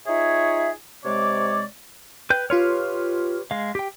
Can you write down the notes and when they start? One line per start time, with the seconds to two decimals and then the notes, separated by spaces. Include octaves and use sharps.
0.07 D#4 F4 G#4 C#5 E5
1.04 C3 G#3 C#5 D5 D6
2.30 B4 G5 G6
2.50 F4 G4 B4 C#5 C6 F6
3.51 G#3 F5
3.75 G4 G5